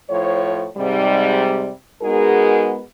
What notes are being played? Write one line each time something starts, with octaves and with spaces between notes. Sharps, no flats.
A2 F3 C5 C#5
G#2 C3 G3
G#3 B3 D#4 F#4 G#4 A#4